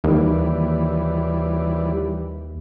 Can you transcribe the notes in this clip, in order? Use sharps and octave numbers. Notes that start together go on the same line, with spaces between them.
D#2 E3 G3